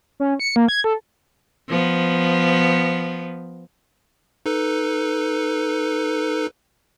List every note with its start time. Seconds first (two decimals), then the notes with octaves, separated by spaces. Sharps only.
0.20 C#4
0.40 C#7
0.56 A#3
0.69 G#6
0.84 A4
1.68 F3 B3
4.46 D#4 A4 B4